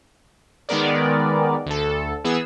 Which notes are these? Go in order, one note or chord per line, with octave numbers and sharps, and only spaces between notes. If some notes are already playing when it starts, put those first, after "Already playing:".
D#3 G#3 B3 A#4 D5
D2 A4
E3 B3 G#4 E6